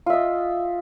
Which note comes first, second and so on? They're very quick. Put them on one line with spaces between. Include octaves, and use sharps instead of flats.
F4 E5 D#5